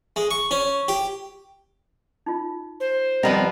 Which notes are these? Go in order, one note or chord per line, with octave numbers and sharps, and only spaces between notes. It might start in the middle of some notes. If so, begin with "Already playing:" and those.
G#3
C#6
C#4
G4
D#4 F4
C5
F3 G3 B3 C4 A#4 D#5 F#5